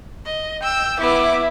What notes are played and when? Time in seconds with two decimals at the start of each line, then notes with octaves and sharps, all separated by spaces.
0.25 D#5
0.63 G5 E6
1.00 B3 E4 D6